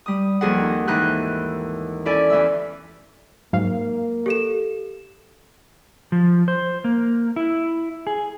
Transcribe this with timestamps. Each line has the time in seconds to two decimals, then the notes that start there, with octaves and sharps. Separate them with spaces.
0.06 G3 D#6
0.41 D#2 F3 G#4 A4 F#5
0.58 C4 D#4
0.88 D#2 G#2 E3 D#4 A4 F#6
2.05 C#4 E4 A4 D5 G#5
2.30 E2 E3 E5 E6
3.53 G#2 F#3 A#3 F5
4.26 G4 A4 E7
6.12 F3
6.48 C5
6.84 A#3
7.36 E4
8.07 G#4